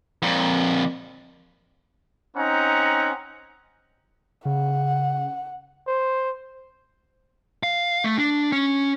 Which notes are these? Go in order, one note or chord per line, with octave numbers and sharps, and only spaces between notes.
F2 A#2
C4 C#4 D#4 F#5 A#5
C#3 F#5
C5
F5
A3
D4
C#4